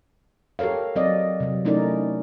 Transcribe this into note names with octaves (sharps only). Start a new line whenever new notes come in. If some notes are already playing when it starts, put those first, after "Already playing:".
G4 A4 A#4 C#5 F5
F#3 C4 D5 D#5
C3 F#3
A3 C#4 D#4 E4 A#4 D5